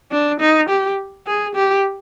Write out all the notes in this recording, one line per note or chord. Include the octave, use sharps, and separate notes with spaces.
D4
D#4
G4
G#4
G4